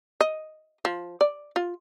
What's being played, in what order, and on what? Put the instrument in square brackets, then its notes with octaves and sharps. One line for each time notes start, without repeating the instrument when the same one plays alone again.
[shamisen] D#5
F3
D5
F4